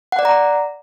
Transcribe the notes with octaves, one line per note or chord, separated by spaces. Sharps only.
F#5
D5
A#5